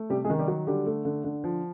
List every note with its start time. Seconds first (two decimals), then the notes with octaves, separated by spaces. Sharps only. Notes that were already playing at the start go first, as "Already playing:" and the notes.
Already playing: A3
0.10 C3 G3 G4
0.25 G#3 G#4
0.30 D#3
0.39 G3 G4
0.48 F#3
0.67 D3 G3 G4
0.86 A3
1.05 D3
1.24 D3
1.44 F3